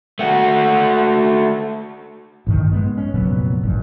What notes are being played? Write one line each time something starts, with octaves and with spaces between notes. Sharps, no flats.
A3 F#4
A1 G2 D#3
G#3 B3
C#4
F1 A#2 F#3 B3
A1 G2